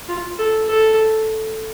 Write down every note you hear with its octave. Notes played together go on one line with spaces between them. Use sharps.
F4
A4
A4